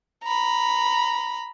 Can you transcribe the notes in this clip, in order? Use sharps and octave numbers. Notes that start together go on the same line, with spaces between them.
A#5 B5